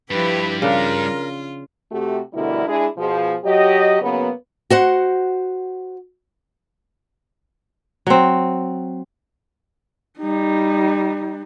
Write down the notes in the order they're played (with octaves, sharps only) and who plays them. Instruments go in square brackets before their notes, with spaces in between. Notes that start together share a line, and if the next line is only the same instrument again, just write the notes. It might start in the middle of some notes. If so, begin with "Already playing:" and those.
[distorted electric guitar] G2 [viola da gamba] F3 E4 G4 [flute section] B4
[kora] C#3 D4 [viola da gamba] F4 [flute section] A#4
[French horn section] C3 A3 F#4 G4
D2 B2 D3 G3 E4 A#4
G#3 D4 E4 G#4
B2 F3 G#4
F#3 G4 D#5
C#3 F#3 A#3 B3
[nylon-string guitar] F#4 C5 F#5
[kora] F#3 C4
[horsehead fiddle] G3 D#4